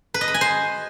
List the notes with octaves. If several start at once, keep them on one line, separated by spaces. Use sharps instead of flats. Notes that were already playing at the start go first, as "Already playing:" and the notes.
B4
D#5
B5
G#5
C5